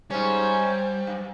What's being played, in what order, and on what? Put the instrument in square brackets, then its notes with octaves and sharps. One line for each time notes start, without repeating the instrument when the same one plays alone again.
[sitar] G#2 C#4 [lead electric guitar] G3 [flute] C5
[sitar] G2